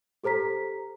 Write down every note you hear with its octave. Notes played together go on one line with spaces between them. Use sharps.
G4 A4 C5 A#5 B6